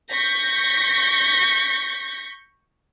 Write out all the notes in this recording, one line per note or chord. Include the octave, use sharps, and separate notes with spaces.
C#6 G6 A#6 B6